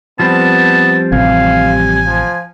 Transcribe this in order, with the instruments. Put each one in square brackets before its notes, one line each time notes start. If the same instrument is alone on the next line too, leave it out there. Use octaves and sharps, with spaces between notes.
[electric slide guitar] F3 G3 C4 [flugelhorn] B3 [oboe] A5
[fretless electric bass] A1 C3 [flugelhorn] F5 [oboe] G#5
[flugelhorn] F3